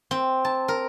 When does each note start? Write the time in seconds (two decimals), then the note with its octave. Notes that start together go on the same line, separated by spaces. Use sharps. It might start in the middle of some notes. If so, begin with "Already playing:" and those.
0.11 C4
0.45 A5
0.68 A#4